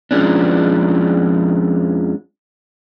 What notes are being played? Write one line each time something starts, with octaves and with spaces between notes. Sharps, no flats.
F2 F3 F#3 G#3 C#4 D4